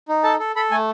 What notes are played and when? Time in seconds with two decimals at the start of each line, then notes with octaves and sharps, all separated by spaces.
0.08 D#4
0.23 A4 A5
0.39 A4
0.56 A4 B5
0.71 A3 G#5